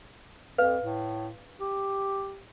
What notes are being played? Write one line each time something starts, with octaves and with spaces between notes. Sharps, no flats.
F2 B4 F5
A2
G4